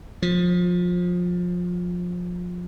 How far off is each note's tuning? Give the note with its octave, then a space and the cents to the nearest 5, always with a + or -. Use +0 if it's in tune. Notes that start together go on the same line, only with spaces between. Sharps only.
F3 +25